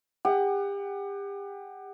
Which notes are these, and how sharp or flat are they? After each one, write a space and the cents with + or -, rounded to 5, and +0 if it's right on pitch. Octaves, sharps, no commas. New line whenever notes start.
G4 +35 F#5 +25